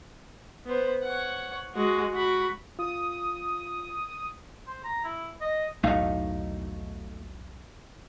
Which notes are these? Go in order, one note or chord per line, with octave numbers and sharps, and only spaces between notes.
B3 C5
C#5 F#5
G#3 F#4
F#4 B5
F4 D#6
C5
A#5
E4
D#5
B1 E2 A2 A3 D#4 F5